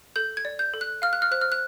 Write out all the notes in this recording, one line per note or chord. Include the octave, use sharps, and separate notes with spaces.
A4 G6
G#6
D5
G6
A4
F#6
F5 F6
F#6
F6
C5 F#6
F6
F#6